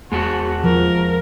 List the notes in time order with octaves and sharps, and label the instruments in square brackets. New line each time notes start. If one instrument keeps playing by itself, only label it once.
[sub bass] E2 [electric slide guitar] G#3 F#5 A5 [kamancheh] F#4
[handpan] F3 [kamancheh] A#4